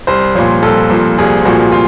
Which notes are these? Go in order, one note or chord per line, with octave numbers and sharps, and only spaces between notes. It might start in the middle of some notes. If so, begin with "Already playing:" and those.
C2 C5
A#2 F3 C#5
C2 A4
A#2 F3
C2 G#4
A#2 F3 F#4
F4